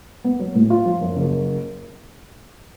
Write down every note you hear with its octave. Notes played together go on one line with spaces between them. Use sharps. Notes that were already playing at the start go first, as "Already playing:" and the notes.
B3
F#3
A2
F4
F3
F#2
F#1